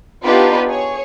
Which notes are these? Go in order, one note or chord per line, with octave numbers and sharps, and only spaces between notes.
B3 D4 D#4 F4 G4 B4
G#4 C#5